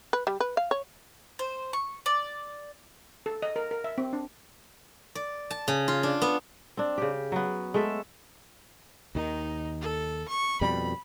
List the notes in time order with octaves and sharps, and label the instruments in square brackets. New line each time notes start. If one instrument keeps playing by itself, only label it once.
[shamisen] B4
G3
B4
F5
C#5
[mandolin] C5
C#6
D5
[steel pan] A4
D#5
A#4
A#4
E5
C4
D4
[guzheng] D5
A5
C#3
F4
D4
B3
[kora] C4 D4
C#3 G4
F#3 B3
G#3 A3 A4 E5
[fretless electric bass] D#2 D#3 [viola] D#4
[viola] A4
C#6
[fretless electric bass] F2 B2 G3 [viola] B5